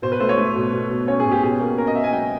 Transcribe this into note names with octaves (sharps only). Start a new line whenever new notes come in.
B2 C5
B4
A3 C5
C#5
A3
B2
B2
B2
C#4 C#5
G#4
B2
G4
B2 G#4
A#3
C#4 A#4
D#5
A#3 E5
G#5
F#3 G5